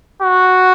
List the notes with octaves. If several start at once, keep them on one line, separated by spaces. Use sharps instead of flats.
F#4